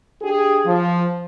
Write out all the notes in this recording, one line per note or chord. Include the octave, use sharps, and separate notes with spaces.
D4 G4 G#4
F3